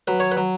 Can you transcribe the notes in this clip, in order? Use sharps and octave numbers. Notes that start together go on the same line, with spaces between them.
F#3 B4
C#5
B4
F#3